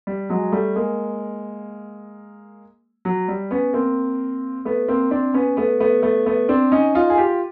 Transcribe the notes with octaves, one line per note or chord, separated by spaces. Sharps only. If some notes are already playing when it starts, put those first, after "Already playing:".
G3
F#3 G#3
G3 A3
G#3 A#3
F#3
G3
B3 C#4
A#3 C4
A3 B3
A#3 C4
C4 D4
B3 C#4
A3 B3
A3 B3
A3 B3
A3 B3
C4 D4
C#4 D#4
D#4 F4
G#4
F4 G4